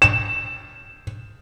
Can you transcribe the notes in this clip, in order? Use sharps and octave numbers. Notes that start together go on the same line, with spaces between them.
E7